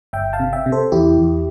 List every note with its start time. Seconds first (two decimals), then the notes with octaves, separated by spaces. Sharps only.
0.13 G1 E5 G5
0.33 F5 A5
0.40 C3
0.53 E5 G5
0.66 C3
0.72 A4 C5
0.92 E2 E4 G4
1.18 E2